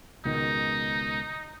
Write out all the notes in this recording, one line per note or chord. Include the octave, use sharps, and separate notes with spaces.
C#2 B2 D#3 D#4